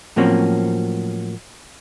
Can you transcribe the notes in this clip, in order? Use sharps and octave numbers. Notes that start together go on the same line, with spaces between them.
A2 F3 F#3 A#3 C4 C#4